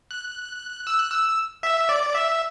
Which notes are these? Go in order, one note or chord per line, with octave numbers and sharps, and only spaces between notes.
F#6
E6
F#6
E6
E5
D5
E5